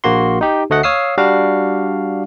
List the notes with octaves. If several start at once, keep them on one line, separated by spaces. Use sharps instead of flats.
A#1 A#3 F#4 C6
D#4 G4
D2 A3 D#5 F#5
C#5 F5 D#6 E6 C7
G3 D4 F#4 F5